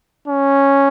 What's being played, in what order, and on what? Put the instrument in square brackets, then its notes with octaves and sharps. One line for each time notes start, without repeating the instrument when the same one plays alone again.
[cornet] C#4